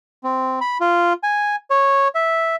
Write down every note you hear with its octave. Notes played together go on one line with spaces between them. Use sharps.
C4
B5
F4
G#5
C#5
E5